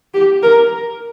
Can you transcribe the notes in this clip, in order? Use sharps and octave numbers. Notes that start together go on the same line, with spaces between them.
G4
A#4